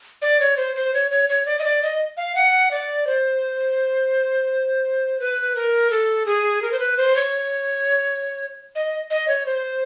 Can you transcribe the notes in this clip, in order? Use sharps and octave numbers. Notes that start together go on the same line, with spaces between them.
D5
C#5
C5
C5
C#5
C#5
C#5
D5
D#5
D5
D#5
F5
F#5
D5
C5
B4
A#4
A4
G#4
A#4
C5
B4
C5
C#5
D#5
D#5
C#5
C5